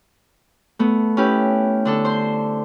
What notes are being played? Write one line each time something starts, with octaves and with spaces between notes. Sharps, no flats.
A3 B3
C#4 E4 G4 B4
D3 D4 A4
C5 C6